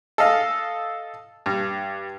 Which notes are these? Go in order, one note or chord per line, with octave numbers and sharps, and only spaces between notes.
A4 D#5 F5
G2